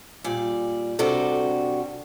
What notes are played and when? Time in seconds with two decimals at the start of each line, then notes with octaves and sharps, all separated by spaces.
0.24 A#2 G3 D5
0.99 C3 G3 D4 F#4 A4